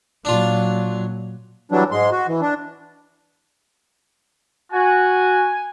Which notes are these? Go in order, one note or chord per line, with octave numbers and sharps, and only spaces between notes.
A#2 F#3 D4 F4
E3 F#3 G3 D4
G#2 G#3 C6
F#4
E3
D4
F#4 G#5